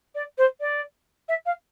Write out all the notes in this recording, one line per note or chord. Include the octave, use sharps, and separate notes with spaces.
D5
C5
D5
E5
F5